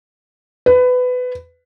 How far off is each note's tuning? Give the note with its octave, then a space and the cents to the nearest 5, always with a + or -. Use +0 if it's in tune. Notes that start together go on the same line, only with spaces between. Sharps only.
B4 +20